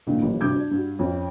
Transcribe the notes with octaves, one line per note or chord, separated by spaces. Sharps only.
G#1 A#2 D3 D#3
A1 D#2 F3 G3
D2 G2 C3 D6 G6 G#6
D4 D5
G2 F#4
F2 C#4